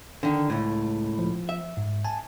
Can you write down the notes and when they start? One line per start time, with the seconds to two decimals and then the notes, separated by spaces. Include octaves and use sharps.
0.23 D3 D#3
0.50 C#2 A2
1.19 F3
1.49 E5
1.77 G#2
2.05 G#5 A5